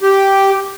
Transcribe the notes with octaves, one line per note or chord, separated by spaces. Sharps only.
G4